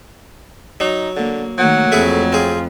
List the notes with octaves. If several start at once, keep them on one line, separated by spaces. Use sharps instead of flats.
F#3 D#4
D3 A#3
D#3 F#3 A3 A#3 F#5
F2 A3 E4 G#4
C4 F4 G#4